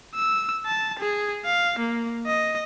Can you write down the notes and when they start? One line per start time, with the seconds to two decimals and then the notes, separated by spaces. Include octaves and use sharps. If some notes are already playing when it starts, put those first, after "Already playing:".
0.15 E6
0.66 A5
0.99 G#4
1.45 F5
1.79 A#3
2.26 D#5